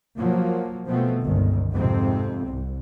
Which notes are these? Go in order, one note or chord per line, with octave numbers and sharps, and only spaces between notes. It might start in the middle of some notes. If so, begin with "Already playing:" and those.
F3 F#3 A#3
B2 F3 A3 B3 C4
G1 C#2 D#3
F2 G#2 C3 C4
C2